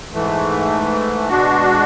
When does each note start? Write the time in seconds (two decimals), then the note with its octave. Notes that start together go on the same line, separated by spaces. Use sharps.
0.13 G#2 E3 A3
1.29 B2 G#3 D4 F#4